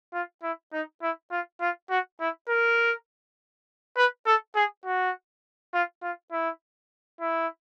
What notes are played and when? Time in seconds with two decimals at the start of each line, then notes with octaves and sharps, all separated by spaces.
0.13 F4
0.43 E4
0.73 D#4
1.02 E4
1.31 F4
1.61 F4
1.90 F#4
2.20 E4
2.49 A#4
3.97 B4
4.26 A4
4.55 G#4
4.85 F#4
5.74 F4
6.03 F4
6.32 E4
7.21 E4